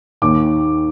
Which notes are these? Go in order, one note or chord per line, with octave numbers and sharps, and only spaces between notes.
D#2 D#3 D6